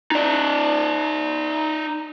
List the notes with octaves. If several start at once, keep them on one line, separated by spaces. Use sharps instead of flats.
D#4 D5